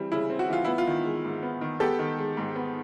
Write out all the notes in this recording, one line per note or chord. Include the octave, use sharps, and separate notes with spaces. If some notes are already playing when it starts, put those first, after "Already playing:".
Already playing: E3 G3 C4
C#3 E4
C4
F#4
E3 F4
B3 E4
F4
D#3
G#3
G#2
B3
D#3
B3 G4 A4
D#3
G#3
G#2
B3